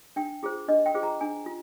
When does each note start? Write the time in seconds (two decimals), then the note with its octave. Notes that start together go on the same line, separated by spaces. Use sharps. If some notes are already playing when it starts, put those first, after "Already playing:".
0.16 D4 G5
0.43 F4 G#4 C5
0.68 D4 D#5
0.86 G5
0.95 F4 G#4 C5
1.03 A#5
1.21 D4 G#5
1.46 F4